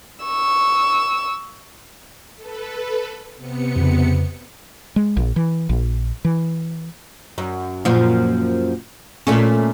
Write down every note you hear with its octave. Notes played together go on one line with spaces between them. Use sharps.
C#6 E6
A4 B4
C3 B3 C#7
F2 C#3
G#3
A#1
E3
A#1
E3
F#2
F#2 A#2 F3
A#2 A3 C#4